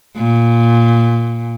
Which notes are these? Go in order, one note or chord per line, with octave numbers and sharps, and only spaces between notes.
A#2